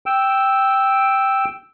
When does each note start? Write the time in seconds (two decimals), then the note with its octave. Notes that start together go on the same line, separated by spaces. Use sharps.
0.06 G5 E6